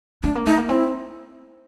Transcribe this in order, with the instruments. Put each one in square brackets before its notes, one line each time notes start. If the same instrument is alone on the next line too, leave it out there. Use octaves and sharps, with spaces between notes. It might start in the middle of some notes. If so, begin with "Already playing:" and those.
[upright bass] A3 [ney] D4
[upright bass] A#3
[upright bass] A3 [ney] D#4
[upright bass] A#3
[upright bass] C4 [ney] E4